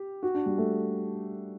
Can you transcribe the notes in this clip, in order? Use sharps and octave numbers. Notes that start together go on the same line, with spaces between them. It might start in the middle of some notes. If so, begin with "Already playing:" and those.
Already playing: G4
F#4
D4
G3
A3